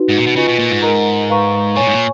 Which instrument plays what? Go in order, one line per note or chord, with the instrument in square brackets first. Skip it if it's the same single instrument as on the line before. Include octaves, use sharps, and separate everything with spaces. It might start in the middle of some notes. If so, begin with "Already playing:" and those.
Already playing: [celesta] D#4 F#4 B4
[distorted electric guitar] G#2
A#2
B2
[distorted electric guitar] C#3 [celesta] F4 B4 D#5 G#5 C#6
[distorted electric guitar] B2
A#2
G#2
[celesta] A#4 D#5 A#5
B4 F5 A#5 C#6
[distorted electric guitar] A#2 [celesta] C#5 G#5 C#6
[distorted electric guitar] G#2
A#2